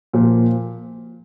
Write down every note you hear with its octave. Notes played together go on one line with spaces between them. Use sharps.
A#2 F3